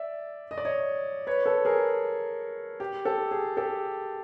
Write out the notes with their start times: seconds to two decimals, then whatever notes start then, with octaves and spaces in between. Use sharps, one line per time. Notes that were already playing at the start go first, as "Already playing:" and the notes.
Already playing: D5 E5
0.51 D#5
0.58 D5
0.65 C#5 D#5
1.27 B4 C#5
1.46 A4 B4
1.65 G#4 A#4
2.80 G4
3.05 G4 A4
3.31 G#4
3.57 G4 A4